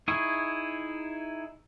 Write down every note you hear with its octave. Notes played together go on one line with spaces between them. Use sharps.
D#4 E4 G#4 C#6